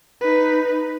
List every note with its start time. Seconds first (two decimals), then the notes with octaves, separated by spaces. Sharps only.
0.21 D#4 B4